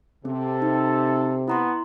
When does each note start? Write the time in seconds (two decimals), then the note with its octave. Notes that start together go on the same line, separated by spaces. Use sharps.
0.25 C3 C4 A4
0.62 D#4
1.48 B3 E4 A#5 C6